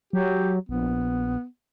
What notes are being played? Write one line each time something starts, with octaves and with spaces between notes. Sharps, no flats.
F#3 G4
A#1 B3